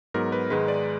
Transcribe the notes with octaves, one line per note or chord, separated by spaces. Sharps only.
G#2 F#3 B3 A#4
B4
G#2 D#3 G#3 B4
D5